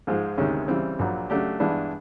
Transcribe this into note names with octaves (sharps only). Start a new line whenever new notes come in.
G#2 F3 G#3
D2 C3 D#3 G#3 C#4
C#3 E3 G3 C4
A#1 A#2 F#3
C#3 F#3 A3 D4 G4
G2 E3 G#3 B3 D4